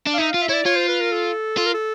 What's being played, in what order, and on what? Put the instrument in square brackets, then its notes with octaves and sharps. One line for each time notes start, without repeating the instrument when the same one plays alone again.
[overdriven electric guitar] D4
[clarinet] F5
[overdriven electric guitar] D#4 [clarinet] E5
[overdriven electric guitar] F4 [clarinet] F5
[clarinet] E5
[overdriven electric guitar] E4 [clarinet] C#5
[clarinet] D5
[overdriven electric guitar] F4 [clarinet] C#5
[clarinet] C5
B4
A#4
A4
[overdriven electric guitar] F4 [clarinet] A4
[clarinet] A#4
A4